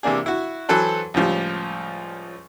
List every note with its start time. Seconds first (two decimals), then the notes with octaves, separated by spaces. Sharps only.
0.03 C3 E3 A#3 D4 G#4
0.26 E4 F#4
0.69 E3 F#3 A4 B4 C5
1.14 C#2 A2 F3 G3